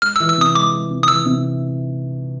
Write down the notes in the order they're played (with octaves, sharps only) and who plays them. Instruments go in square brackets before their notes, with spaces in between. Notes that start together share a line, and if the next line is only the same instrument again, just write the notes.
[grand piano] G#3 [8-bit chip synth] F6
[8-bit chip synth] E6
[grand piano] E3
[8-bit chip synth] E6
[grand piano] C3 [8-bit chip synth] D#6
[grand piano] G#3 [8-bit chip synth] D6
[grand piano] G#3
C3
[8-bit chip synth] D#6
[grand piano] E3 [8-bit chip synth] E6
[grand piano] C3